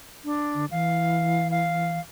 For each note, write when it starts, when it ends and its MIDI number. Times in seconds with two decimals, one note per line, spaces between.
0.25 0.65 62
0.54 0.66 50
0.71 1.98 52
0.71 1.50 77
1.51 2.00 77